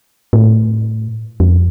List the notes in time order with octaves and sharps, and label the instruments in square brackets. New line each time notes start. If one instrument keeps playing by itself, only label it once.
[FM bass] A2
F2